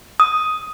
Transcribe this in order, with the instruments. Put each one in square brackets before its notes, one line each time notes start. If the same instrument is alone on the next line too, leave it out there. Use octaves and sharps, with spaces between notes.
[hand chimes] D#6